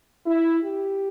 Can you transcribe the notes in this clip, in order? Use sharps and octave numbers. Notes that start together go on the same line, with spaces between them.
E4
G4